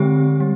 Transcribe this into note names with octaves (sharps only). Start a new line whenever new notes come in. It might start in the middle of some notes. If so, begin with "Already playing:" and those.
Already playing: D3 G#3 C4 G4
G3